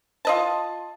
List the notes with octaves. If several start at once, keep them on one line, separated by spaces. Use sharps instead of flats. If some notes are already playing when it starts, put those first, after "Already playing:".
F4 D#5 A5